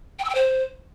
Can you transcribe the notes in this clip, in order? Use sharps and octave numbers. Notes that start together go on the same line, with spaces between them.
G5
E6
G5
C5